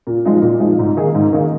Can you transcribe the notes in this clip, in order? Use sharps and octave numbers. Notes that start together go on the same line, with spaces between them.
A#2
F3 G#3 D#4
A#2
F3 G#3 D#4
G#2
D#3 A#3 D#4 G#4
G#2
D#3 A#3 D#4 G#4